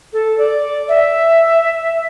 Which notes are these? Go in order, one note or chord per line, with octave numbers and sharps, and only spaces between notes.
A4
D5
E5